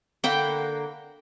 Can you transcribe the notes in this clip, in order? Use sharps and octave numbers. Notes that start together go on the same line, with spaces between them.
D3 A#3 F#5 G5 B5